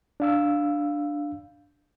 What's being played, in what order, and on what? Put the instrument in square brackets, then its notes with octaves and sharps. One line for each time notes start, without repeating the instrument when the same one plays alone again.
[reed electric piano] D4 F5 E6